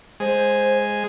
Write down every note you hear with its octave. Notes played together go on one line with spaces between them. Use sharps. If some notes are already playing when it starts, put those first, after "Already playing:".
G#3 C5